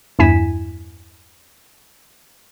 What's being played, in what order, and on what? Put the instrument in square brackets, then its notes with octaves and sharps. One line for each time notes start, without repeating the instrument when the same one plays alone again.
[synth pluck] E2 G2 E4 G#5 B6 E7